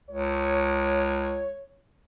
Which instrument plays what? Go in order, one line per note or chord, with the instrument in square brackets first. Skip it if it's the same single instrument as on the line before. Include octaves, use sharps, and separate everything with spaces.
[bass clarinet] C#2 [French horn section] C#5